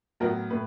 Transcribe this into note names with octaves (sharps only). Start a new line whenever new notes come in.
A2 F#3 B3 A#4
A2 B4